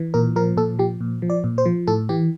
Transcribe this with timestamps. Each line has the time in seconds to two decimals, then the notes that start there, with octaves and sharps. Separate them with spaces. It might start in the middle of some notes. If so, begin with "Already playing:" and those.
Already playing: E3
0.14 A#2 A#4
0.36 F3 A#4
0.57 A#2 A4
0.79 F3 G4
1.01 A#2
1.22 F3
1.30 D5
1.44 A#2
1.58 C5
1.66 F3
1.87 A2 A4
2.09 E3 G4